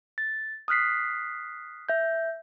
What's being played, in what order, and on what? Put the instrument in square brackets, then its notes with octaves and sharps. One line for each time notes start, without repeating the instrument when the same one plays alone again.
[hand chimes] A6
D#6 F6 F#6 B6 C7
E5 G6